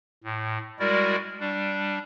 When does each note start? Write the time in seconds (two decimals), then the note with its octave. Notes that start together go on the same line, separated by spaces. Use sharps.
0.24 A2
0.79 G3 G#3 E4 F#4 A#4 D5
1.40 G3 D4